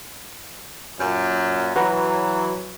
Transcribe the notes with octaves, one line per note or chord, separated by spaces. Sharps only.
F#2 A#2
E3 F#3 F#4 B4 A#5